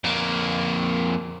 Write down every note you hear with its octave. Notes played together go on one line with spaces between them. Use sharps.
F2 A#3